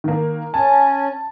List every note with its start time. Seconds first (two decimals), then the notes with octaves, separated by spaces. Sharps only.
0.04 D#3 A#3
0.54 C#4 G#5 A5